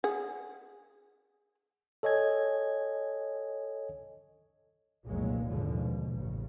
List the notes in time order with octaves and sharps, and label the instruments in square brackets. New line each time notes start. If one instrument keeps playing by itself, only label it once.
[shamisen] G#4 F#5
[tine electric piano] A4 C#5 D#5 G#5 G#6
[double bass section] F1 C2 A#2 F#3 G#3 A#3
G#1 D#2 B2 D3 F3 G#3
B2
A1 G2 C#3